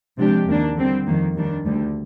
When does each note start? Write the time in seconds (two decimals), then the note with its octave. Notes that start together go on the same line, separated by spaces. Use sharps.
0.19 C3 F3 G#3 D4 G4
0.48 D#2 D#3 A#3 D4
0.77 D3 G3 C4
1.07 F2 D#3 A#3
1.36 D#2 D#3 G3 D4
1.66 D2 D3 G3